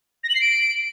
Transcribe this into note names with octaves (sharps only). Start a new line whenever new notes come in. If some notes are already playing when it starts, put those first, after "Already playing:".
A#6
F#7
C7
D7